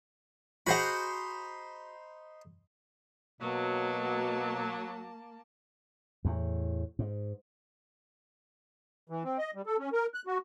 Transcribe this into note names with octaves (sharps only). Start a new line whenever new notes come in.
D#4 F#4 G#4 C5 F#5 B5
B2 F#3 A#3 A5
E2 A2
G#2
E3
C4
D#5
G3
A4
C#4
A#4
F#6
F#4